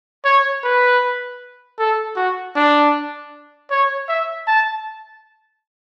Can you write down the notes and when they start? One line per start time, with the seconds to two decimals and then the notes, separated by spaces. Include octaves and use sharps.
0.25 C#5
0.64 B4
1.79 A4
2.16 F#4
2.56 D4
3.71 C#5
4.08 E5
4.48 A5